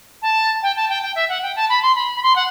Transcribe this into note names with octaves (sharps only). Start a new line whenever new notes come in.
A5
G5
A5
G5
G5
E5
F#5
G5
A5
B5
C6
B5
B5
C6
F#5